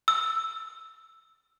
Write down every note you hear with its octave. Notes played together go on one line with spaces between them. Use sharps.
E6